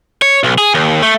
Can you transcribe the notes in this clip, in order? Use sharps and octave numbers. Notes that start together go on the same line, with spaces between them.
C#5
B1
G#4
D#2
A3